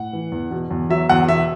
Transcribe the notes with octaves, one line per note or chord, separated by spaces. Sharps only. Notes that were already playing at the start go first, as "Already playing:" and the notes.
Already playing: A2 F#5
E3
E2
B2
E2
F#3 E5
E2 F#5
B2 E5